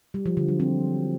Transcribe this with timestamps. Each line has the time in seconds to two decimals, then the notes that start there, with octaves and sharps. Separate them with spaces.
0.14 G3
0.26 F3
0.37 D3
0.48 F#3
0.60 C4